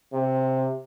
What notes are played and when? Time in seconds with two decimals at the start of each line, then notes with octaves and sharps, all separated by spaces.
0.13 C3